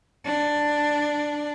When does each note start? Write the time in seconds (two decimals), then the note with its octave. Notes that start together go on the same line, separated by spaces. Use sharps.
0.25 D4